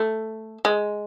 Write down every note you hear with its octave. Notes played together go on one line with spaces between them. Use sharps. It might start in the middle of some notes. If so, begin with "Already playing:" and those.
Already playing: A3
G#3